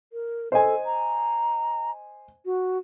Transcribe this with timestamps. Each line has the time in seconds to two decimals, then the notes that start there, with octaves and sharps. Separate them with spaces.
0.13 A#4
0.52 A4 C5 D#5 G#5
0.86 A#5
2.46 F#4